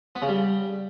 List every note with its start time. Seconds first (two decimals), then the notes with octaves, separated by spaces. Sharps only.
0.15 B3
0.22 C#3
0.29 G3